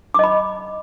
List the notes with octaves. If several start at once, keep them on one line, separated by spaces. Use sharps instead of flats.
D#5 B5 D6